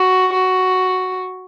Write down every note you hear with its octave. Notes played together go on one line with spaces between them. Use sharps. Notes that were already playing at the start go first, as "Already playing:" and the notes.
Already playing: F#4
F#4